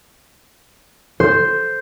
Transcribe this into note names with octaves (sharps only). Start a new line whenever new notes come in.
C5